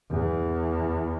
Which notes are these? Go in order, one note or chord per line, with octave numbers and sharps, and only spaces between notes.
E2